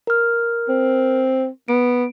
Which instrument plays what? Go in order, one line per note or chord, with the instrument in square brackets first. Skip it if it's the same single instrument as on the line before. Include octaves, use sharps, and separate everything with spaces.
[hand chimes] A#4 F6
[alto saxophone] C4
[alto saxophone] B3 [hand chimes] D7